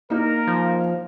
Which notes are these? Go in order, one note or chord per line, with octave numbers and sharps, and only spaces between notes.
A#3 D#4 A#4
F3